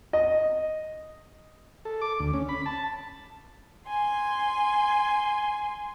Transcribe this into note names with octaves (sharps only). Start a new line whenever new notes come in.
D#5
A4
D6
D2
C#4
B5
A5
G#5 C6